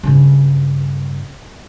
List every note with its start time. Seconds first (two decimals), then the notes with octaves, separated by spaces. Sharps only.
0.03 G2 C#3